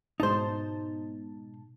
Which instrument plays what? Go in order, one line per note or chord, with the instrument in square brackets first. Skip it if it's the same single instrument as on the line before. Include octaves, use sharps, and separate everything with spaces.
[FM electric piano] G#2 B2 A5 [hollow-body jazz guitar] D#4 C5